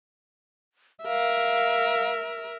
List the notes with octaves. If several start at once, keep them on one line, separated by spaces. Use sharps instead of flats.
A#4 E5 F5